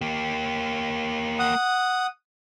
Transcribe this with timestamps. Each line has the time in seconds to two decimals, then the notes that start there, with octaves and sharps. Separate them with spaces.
0.01 A#3 G4
1.39 F#5 D#6